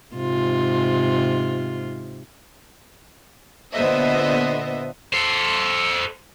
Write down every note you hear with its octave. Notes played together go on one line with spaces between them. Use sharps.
G#2 C3 F4
A#2 D3 B3 C5 D#5 E5
A4 C5